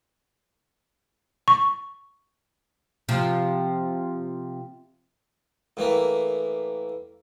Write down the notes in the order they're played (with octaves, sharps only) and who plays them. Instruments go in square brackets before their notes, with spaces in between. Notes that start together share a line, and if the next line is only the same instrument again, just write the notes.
[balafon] C#6
[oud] C3 F3
[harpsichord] A2 E3 A#3